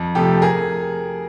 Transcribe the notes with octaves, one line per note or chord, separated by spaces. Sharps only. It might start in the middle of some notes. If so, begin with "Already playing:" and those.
Already playing: F2
C3 F3 A3 G4 A4
G#4 A#4